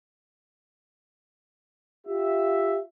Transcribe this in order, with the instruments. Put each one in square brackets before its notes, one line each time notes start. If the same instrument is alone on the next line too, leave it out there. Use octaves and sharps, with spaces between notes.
[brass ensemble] F4 G4 E5